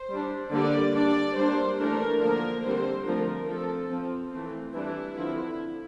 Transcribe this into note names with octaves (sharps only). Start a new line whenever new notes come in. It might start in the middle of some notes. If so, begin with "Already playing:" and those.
Already playing: C5
G3 D4
D3 G3 A#3 D5
G3 D4 D5
G3 A#3 D4 C5
E3 A3 D4 A#4
D3 F3 A#3 D4 A#4
D3 G3 C4 C5
D3 F3 A3 C4 A#4
F3 C4 A4
F3 C4
E3 A3 C4
E3 G3 D4 E4
D3 F3 C4 E4